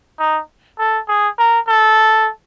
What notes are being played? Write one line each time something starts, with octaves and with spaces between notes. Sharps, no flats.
D#4
A4
G#4
A#4
A4